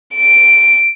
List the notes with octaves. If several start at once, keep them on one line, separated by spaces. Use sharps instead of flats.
D7